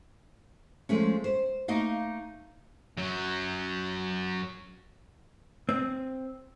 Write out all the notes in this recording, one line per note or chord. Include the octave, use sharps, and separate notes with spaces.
F3 G#3 A3 C#4
C5
A3 A#3 D#4 D#5 F5
F#2 F#3
C4